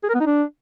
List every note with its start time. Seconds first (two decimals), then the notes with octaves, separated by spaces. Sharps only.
0.03 G#4
0.09 A#4
0.15 B3
0.21 D#4
0.26 D4